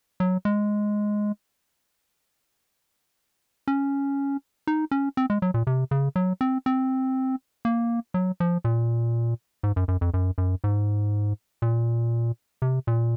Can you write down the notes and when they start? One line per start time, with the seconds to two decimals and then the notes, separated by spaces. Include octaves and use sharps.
0.20 F#3
0.45 G#3
3.68 C#4
4.67 D#4
4.91 C#4
5.17 C4
5.30 G#3
5.42 F#3
5.54 A#2
5.67 C3
5.91 C#3
6.16 F#3
6.41 C4
6.66 C4
7.65 A#3
8.14 F#3
8.40 F3
8.65 A#2
9.63 G#2
9.76 F#2
9.88 F#2
10.01 F2
10.14 F#2
10.38 F#2
10.64 G#2
11.62 A#2
12.62 C3
12.87 A#2